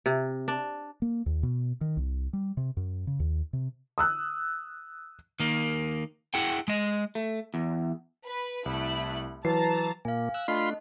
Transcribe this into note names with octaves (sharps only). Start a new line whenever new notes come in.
C3
D4
A#3
D#2
B2
D#3
C2
G3
C3
F#2
C#3
D#2
C3
D#6 E6 F#6
D#3 A#3
E4 G#4 F#5 G5
G#3 D#5
A3
E2
B4
C2 A3 E4 F#6
E3 F#3 B4 A5 A#5 A6 C7
A#2 A#3 F5 G#5
E6 F#6
A3 D4 F4 D#5 A5 B5 C6